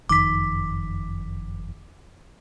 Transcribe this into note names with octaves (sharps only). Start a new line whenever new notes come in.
F#1 F2 D#3 D6 B6